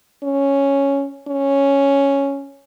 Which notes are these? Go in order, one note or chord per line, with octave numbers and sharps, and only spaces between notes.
C#4
C#4